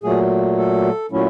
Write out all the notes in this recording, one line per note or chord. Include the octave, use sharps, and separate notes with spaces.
A#2 F#3 A3 G#4
A4
A#2 F#3 A3 C#4 E4